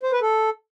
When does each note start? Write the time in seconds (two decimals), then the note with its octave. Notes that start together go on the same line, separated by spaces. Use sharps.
0.03 C5
0.12 B4
0.22 A4